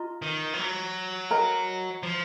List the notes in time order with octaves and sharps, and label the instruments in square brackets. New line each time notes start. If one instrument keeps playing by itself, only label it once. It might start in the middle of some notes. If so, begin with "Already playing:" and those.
Already playing: [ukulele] F4 D#5 A#5
[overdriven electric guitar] D#3
F3
F#3
[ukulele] A#4 D#5 A#5
[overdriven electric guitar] F3